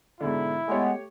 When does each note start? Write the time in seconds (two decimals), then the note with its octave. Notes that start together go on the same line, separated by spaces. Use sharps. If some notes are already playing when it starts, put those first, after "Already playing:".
0.20 G#2 B2 D3 E4
0.68 G#3 A3 B3 G4 C#5